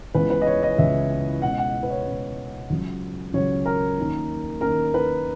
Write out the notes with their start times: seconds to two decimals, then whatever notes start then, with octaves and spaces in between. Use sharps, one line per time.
0.15 C#2 C#3 E3 G#3 B3 B4
0.30 B4
0.42 D#5
0.47 C#5
0.63 D#5
0.78 C#2 C#3 E3 G#3 B3 E5
1.42 B2 G#3 C#4 F#5
1.58 F#5
1.83 B4
1.90 C#5
2.06 B2 G#3 C#4
2.70 C#2 C#3 F#3 C#4
3.34 C#2 C#3 F#3 C#4 C#5
3.66 A#4
3.98 D#2 D#3 A#3 C#4
4.61 D#2 D#3 A#3 C#4 A#4
4.94 B4